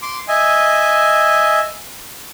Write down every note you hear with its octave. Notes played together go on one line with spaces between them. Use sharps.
C6 D6
D#5 E5 G#5